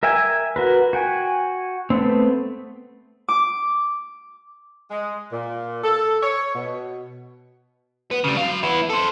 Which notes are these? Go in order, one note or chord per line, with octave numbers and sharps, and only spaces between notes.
A#4 E5 G5 G#5
F#4 A#4 B4
F#4 G5 G#5
A3 B3 C4
D6
G#3
A#2
A4
C#5
B2
B3
C#3 G3
F#3 F5
B3 E4
A4 C5